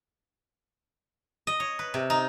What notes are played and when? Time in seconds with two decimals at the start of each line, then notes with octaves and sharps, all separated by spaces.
1.47 D#5
1.60 C#5
1.79 B4
1.94 C3
2.10 D#4